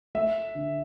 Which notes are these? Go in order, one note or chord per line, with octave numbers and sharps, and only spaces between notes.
A3 E5
D3